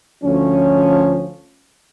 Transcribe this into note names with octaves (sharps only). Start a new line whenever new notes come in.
D2 F3 C#4